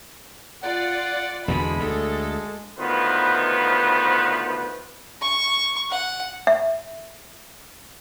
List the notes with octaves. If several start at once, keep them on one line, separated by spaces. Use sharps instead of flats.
F4 D5 F#5
E2 B2 D3 G#3 B5
D2 A4
D2 D#3 B3 F4 B4 C5
C#6
F#5
E5